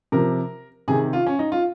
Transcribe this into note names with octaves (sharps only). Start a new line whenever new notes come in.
C3 F3 A#4
C3 D#3 G#4
F4
C#4
D#4
F4